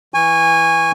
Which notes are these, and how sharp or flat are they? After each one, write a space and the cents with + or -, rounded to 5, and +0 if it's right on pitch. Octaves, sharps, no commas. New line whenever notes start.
E3 +0 G#5 -20 C#6 +0